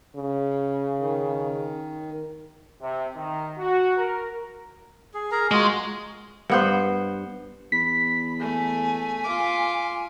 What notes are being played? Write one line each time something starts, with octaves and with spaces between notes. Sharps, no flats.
C#3
D#3
C3
D#3
F#4
A#4
G#4
G#4 A#4 A#5
G#3 F4 F#4 D#5
G2 B3 C5
E2 B5 B6
A3 G#5
F4 D6